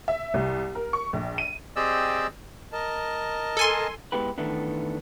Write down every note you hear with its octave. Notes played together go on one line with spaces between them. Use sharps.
E5
C2
A#4
C#6
A#1
D#7
C4 G4 G#4 D5 D#5 E6
A#4 D#5 A5
A4 G#5 C6
G#3 B3 E4 G4 B4
D#3 E3 A3 B3 D4